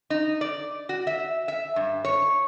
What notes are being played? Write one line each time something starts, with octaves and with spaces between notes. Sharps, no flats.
D#4
D5
F#4
E5
E5
G2
C#5